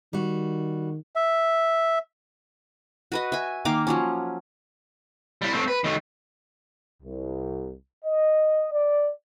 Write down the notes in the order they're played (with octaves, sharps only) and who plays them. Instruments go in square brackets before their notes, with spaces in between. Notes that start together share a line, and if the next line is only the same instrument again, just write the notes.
[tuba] D#3 [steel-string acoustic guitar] G3 F#4
[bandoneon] E5
[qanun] F#4 B4 D#5
E5 G#5
D#3 A#3 F5 D6
F3 F#3 C#4
[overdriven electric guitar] G3 E4
A3 C4
B4
D#3 A3
[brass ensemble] C2
D#5
D5